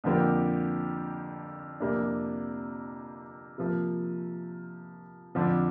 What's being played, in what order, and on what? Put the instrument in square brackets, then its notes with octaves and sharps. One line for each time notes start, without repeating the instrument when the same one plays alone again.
[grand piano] F2 D3 F3 A#3 G4
F2 C3 A#3 D4
C3 F3 A#3
F2 D3 F3 D4